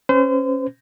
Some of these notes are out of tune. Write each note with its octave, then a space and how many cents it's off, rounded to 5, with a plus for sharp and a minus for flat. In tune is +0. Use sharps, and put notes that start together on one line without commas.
C#4 -20 C5 -35